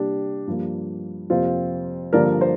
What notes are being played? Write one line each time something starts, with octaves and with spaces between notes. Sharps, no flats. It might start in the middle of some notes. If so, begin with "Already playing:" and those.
Already playing: C3 G3 A#3 D4 G4
G2 F3 A#3
F2 C3 A#3 C4 F4
G2 D3 F3 A#3 A#4 D5
C5